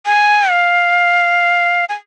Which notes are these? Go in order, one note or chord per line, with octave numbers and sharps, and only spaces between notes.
G#5
F5
G#5